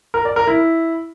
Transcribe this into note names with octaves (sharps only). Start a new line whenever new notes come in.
A#4
D5
A#4
E4